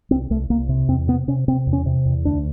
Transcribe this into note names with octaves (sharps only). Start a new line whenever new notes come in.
C2 C4
C2 A3
C2 A#3
C3
E2 C4
C3 B3
C3 C#4
C3 C4
E2
C#4
C3
E2
D2 D4